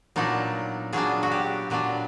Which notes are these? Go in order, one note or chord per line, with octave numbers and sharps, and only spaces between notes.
A#2 F#3 B3 D4 D#4
A#2 F#3 B3 D4 G#4
F#4
G4
A#2 F#3 B3 D4